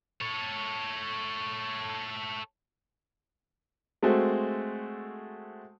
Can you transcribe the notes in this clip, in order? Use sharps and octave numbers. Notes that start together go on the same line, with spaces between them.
A4 C#5
G#3 A3 C4 F#4 A4